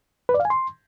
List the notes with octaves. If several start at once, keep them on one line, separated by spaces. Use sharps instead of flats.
B4
D5
F5
G#5
C6